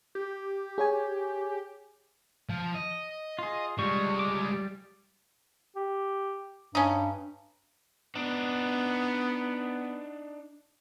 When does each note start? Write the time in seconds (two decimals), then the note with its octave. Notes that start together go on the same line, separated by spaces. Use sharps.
0.15 G4
0.78 G#4 C#5 G#5
2.49 F3
2.75 D#5
3.39 F4 G#4
3.79 G3 G#3 F4 C#6
4.19 D6
5.76 G4
6.75 G2 C#4 D#4
8.16 B3 D4 D#4